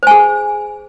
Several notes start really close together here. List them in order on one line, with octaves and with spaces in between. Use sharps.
C5 G#5 G#4